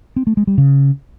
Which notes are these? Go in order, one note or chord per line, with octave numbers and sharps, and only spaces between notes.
C4
A3
G#3
G3
C#3